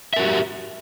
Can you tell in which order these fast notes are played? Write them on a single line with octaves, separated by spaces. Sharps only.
E5 A#4 F#4 G4